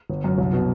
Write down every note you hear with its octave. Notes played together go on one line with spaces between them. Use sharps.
G1
F#2
C2
B2